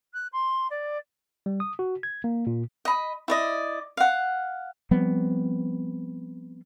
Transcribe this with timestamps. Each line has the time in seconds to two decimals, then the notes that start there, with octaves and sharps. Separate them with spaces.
0.13 F#6
0.32 C6
0.70 D5
1.46 G3
1.60 D#6
1.79 F#4
2.03 G#6
2.24 A#3
2.47 A#2
2.85 D#5 B5
3.28 E4 D5 D#5
3.97 F5 F#5
4.91 F3 G3 B3 C4